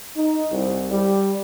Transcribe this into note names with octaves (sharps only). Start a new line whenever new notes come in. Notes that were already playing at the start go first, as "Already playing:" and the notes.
D#4
C2
G3